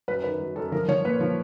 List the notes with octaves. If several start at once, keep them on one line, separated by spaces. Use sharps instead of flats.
F#2 B4
D#3 B4
F#3
F#2 A4
F3 A#4
F3 C#5
A#2 B4
F3